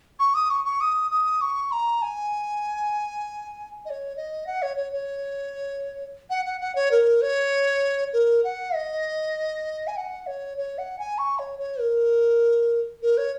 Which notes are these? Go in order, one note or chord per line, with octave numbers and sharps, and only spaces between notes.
C#6
D#6
C#6
C#6
D#6
D#6
C#6
A#5
G#5
D#5
C#5
D#5
F#5
C#5
C#5
C#5
F#5
F#5
F#5
C#5
A#4
C#5
A#4
F#5
D#5
G#5
F#5
C#5
C#5
F#5
G#5
C#6
C#5
C#5
A#4
A#4
C#5